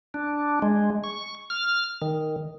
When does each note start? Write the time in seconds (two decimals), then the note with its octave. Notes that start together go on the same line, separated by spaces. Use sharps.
0.14 D4
0.62 G#3
1.04 C#6
1.50 F6
2.02 D#3